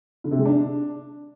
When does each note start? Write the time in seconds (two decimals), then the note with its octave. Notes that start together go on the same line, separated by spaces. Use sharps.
0.24 D3
0.31 C3
0.38 G#3
0.45 D4